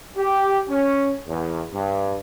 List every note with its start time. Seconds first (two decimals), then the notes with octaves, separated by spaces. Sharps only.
0.16 G4
0.68 C#4
1.28 E2
1.73 G2